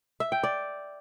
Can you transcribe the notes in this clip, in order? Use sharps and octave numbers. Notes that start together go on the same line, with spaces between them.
E5
G5
D5